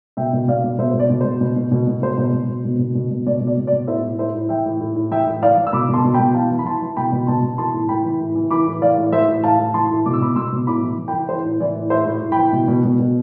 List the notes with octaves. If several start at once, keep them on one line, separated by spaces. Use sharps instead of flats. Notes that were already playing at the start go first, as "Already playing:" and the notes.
B2 E5 G5
B2
B2 D5 F5
B2
B2 C5 E5
B2 C5
D5
B2
B2 C5
B2
B2
B2
B2
B2 C5
B2 C5
B2
B2
B2
B2
B2
B2
B2 D5
B2
D5
B2
D5
B2
A2 C5 E5
A2
A2 C5 E5
A2
E3 E5 G5
A2
A2
A2
E3 E5 G5
A2
E3 D5 F5
E3
E6
B2 B5 D6
B2 A5 C6
B2
G5 B5
B2
E3 F5 A5
E3
B5
E3 A5 C6
E3
B2 G5 B5
B2
B2 A5 C6
B2
E3 A5 C6
A2
E3 G5 B5
E3
A2
E3
E3 B5 D6
A2
E3 D5 F5
A2
E3 C5 E5
A2
A2 F5 A5
A2
E3 A5 C6
A2
B2 D6
E6
B2 B5 D6
B2 C6 E6
B2
A2 B5 D6
E3
E3
G5 B5
E3
E3 C5
A2
E3 D5
A2
A2 C5 E5
A2
A2
E3 G5 B5
B2
B2
B2
B2